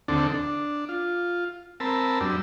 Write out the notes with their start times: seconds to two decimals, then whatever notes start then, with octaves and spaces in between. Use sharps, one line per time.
0.08 D#2 D3 C4 D4 A4
0.34 D4
0.89 F4
1.80 C4 A#4 A5 B5 E6
2.21 F#2 G3 D4 E6